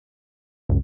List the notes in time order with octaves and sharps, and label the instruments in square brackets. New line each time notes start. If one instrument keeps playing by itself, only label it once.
[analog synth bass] C#2 [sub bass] F#2